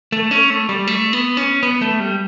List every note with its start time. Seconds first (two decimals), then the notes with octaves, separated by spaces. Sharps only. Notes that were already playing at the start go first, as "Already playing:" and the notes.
0.12 A3
0.31 C#4
0.50 A3
0.69 G3
0.87 A3
1.13 B3
1.37 C#4
1.63 B3
1.81 A3
2.00 G3